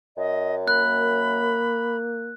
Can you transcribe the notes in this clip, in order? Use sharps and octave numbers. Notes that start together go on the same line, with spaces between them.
F#2 D#5
A#3 B5 F#6